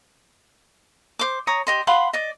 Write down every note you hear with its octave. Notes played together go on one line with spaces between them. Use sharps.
C5 D6
C#5 A#5 D#6
G4 D#5 C6
F5 F#5 B5 C6
D5 D#5